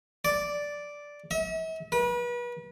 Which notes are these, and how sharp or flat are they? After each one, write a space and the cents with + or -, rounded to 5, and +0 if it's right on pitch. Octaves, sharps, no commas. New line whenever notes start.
D5 -5
E5 -45
B4 -35